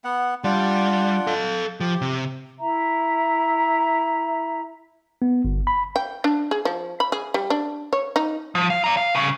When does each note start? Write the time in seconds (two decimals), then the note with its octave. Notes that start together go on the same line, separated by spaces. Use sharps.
0.04 B3 F#5
0.44 G3 D4 F4 F#5
1.27 A4 F5
1.80 F3 G4
2.02 C3
2.60 E4 E5 A#5
5.22 B3
5.45 G1
5.67 B5
5.96 G5
6.24 D4
6.51 G#4
6.65 F3
7.00 B5
7.12 G#4
7.34 G3
7.50 D4
7.93 C#5
8.16 D#4
8.55 F3
8.70 F5
8.84 D5 A#5
8.97 F5
9.15 C2 C#3